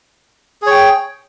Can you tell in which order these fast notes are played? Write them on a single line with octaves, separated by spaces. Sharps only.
G#4 C#5 G5